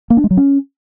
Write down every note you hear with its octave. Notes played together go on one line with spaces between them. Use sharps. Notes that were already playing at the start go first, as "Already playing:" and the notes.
A#3
D4
G#3
F#3
C#4